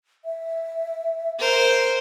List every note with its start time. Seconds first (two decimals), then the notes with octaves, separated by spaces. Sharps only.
0.25 E5
1.40 A#4 C5